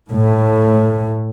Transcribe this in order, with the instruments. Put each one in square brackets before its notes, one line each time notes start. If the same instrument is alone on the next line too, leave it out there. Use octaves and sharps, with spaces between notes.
[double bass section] A2